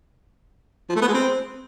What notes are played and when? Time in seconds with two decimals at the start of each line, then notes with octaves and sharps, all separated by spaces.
0.89 F3
0.96 A3
1.02 B3
1.08 G#3
1.14 C4